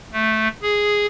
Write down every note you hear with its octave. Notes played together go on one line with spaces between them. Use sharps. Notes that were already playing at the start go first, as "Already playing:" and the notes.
A3
G#4